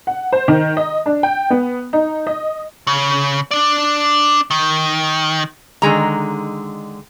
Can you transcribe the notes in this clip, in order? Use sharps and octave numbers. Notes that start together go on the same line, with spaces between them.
F#5
C5
D#3
D#5
D4
G5
B3
D#4
D#5
C#3
D4 D5
D#3
D3 D#3 G#3 A#5